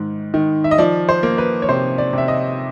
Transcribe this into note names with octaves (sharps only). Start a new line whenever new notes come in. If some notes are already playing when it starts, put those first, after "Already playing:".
Already playing: G#2 D#3
D#3
E5
D#5
F3 D5
C5
A#3
B4
C#5
C3 C5
D5
C3 E5
D#5